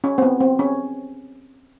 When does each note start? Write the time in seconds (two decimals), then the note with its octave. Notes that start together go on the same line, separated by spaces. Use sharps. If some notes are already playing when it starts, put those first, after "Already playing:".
0.04 C#4
0.18 C4
0.22 B3
0.40 C4
0.59 C#4